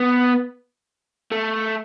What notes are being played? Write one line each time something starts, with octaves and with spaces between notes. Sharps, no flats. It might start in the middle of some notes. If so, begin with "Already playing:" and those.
Already playing: B3
A3